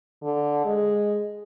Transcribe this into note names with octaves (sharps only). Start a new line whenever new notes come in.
D3
G#3